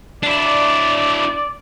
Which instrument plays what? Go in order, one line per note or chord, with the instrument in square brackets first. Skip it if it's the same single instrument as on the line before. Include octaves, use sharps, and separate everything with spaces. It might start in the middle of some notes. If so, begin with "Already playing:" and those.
[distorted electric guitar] D4 E4 [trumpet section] D5